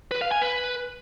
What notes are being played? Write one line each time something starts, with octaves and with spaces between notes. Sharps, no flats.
B4
F5
G#5
B4